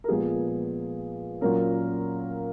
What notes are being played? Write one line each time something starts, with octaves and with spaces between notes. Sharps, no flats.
A#4
A#2 F3 G#3 B3 G#4
A#2 F#3 C#4 A#4